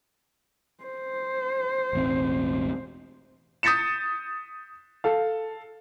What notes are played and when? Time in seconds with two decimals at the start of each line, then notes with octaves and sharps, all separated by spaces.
0.83 C5
1.93 E1 A1 C4
3.63 D#6 G6 A6 B6 C#7 E7
5.04 A4 F5